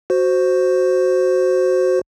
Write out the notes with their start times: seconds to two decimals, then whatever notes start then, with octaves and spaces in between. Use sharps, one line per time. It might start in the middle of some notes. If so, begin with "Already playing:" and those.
0.10 F#4 C5